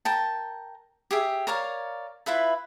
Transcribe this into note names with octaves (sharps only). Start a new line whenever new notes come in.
A#4 G5 A5
G4 G#4 E5
A#4 C#5 D5 F5
E4 F4 B4 E5